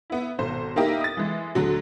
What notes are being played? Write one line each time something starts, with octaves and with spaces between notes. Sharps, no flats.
B3 E4
G#1 B2 A4 C5
A#3 D#4 E4 G4 A#4 D#5
D#6 A6
E3 G#3
D2 D3 F#3